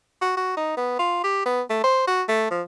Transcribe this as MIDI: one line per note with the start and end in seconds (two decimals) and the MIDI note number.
0.22 0.32 66
0.37 0.57 66
0.57 0.74 63
0.77 0.99 59
0.99 1.22 65
1.24 1.43 67
1.46 1.62 59
1.70 1.81 57
1.84 2.04 72
2.07 2.23 66
2.28 2.47 57
2.51 2.62 53